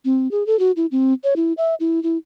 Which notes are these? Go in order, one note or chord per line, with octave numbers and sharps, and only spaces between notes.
C4
G#4
A4
F#4
E4
C4
C#5
E4
E5
E4
E4